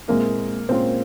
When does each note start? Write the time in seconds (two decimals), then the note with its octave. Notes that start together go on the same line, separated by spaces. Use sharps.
0.08 A#2 G#3 A#3 C4 E4
0.69 A#2 G#3 C4 C#4 F4